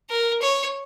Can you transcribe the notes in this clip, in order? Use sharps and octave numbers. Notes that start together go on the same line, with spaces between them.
A#4
C#5